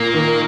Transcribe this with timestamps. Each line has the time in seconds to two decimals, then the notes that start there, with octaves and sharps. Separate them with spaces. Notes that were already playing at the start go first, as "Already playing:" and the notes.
Already playing: A#2 A#3
0.14 D#3